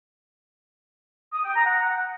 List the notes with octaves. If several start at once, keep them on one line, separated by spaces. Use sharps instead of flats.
D#6
G5
A#5
F#5